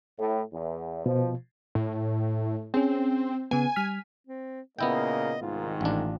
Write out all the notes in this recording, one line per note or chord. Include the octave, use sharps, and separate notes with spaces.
A2
E2
B2 F3
A2
C4 C#4 G#4
C#3 B3 G#5
G3 F6 B6
C4
A#2 C#3 A#3 B3 E4 D#5 G5
C2 G#2 D#3 F4
A1 D4 F4